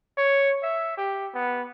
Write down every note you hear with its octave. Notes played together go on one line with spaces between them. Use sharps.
C#5
E5
G4
B3